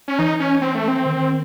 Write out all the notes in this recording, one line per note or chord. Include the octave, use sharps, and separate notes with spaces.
C#4
E3 D#4
C#4
C4
A3
C4
D#3